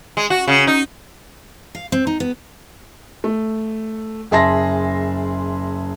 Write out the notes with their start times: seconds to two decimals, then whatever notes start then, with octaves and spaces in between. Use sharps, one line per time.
0.17 G#3
0.30 F#4
0.48 C#3
0.67 D#4
1.75 F5
1.92 C4
2.07 D#4
2.20 B3
3.24 A3
4.31 F#1 G#4 E5 A5 C6 A#6